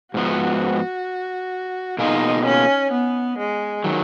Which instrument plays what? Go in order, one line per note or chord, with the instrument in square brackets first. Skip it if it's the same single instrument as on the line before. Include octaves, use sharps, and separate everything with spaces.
[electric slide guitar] G#2 F3 B3 [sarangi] F#4
[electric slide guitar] B2 A#3 F4 G#4 [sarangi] D#4
[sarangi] C#4
B3
G#3
[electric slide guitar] D#3 F#3